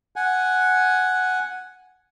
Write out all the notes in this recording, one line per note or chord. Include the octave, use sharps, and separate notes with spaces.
F#5 G#5